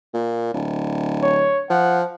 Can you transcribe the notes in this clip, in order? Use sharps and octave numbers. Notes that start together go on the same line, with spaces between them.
A#2
D1
C#5
F3 F#5